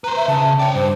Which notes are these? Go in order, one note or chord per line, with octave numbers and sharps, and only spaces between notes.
B4 C5 A#5
E5
C#3 A5
C#5 D5 G5
G2 C5